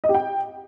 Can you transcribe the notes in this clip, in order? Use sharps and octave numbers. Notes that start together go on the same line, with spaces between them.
D#5
G4
G5